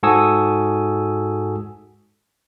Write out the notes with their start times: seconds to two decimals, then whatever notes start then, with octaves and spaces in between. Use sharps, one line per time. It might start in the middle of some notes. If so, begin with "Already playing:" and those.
0.03 G#2 F#4 A4 G#5 D#6 E6